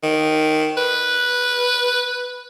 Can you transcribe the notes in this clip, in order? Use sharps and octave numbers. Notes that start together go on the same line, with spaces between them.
D#3
B4